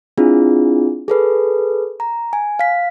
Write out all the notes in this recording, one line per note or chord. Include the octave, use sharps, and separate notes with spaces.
C4 D4 E4 F4 G#4
G#4 A4 B4
A#5
G#5
F5 B6